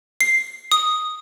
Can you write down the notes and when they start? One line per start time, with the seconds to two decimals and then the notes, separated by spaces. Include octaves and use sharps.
0.21 C7
0.72 D#6